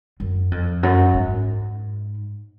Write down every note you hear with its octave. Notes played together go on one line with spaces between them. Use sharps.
F#2
F2
F#2
G#2